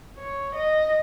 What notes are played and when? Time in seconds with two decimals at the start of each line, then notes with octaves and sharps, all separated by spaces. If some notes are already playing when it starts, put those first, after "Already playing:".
0.18 C#5
0.55 D#5